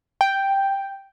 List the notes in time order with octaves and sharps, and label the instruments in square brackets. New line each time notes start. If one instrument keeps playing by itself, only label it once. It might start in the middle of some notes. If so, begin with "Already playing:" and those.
[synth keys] G5